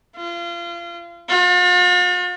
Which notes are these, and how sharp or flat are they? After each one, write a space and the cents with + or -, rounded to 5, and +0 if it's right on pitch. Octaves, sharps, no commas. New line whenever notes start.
F4 -30
F4 +45